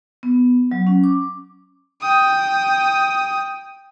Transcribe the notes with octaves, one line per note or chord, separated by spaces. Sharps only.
B3
F#3
C#4
D6
G5 D#6